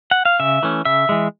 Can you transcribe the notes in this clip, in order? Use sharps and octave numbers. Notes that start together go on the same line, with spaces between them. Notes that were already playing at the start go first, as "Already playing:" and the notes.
F#5
F5
C#3 E5
E3 A3 C#4
C#3 E5
E3 G#3